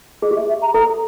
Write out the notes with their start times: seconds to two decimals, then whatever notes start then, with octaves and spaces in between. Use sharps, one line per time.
0.22 G#4 D#5
0.31 G4
0.36 E5
0.39 G#4
0.49 E5
0.62 A#5
0.74 A4 A#5